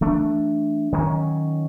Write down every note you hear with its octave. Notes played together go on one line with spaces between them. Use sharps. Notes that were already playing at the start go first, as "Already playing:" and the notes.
E3 A3 D4
D#3 F#3 A#3 C#4